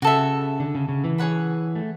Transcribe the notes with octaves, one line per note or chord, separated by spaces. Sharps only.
C#3 F#4 A4 E5
D3
C#3
C#3
E3
G#4 C#5 F#5 B5
A3